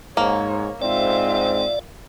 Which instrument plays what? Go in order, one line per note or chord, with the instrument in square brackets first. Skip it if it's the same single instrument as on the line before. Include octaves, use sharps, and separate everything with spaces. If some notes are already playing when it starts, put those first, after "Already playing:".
[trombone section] G#2 [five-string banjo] A#3 [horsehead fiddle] C#5
[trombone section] G#2 C4 [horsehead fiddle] F4 E5 [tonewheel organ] D5